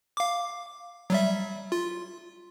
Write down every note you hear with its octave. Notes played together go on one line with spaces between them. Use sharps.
F5 D6
F#3 G3 E5
F4